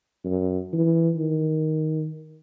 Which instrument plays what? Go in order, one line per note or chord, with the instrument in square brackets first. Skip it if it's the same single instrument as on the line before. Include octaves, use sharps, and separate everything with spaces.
[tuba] F#2
E3
D#3